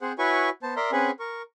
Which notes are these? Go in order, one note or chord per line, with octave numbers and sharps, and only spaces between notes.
C4 G#4 C5 F#5
E4 F#4 B4 C#5 G#5 C#6
B3 C5 A5
A#4 D5 E5 A#5 C6
C4 C#4 G#4 B4 F#5 G#5
A#4 C#6